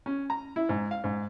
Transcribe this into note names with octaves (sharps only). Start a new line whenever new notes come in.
C#4
A#5
E4
G#2
F5
G#2